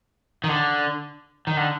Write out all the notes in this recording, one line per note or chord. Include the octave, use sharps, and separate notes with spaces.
D#3
D3
D#3
D3